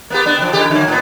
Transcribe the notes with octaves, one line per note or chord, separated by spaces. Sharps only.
A#3 B3 G4
B3 D4
C#3 F3
A#2 C#3 G4
D3 F#3 A#3
A2 B3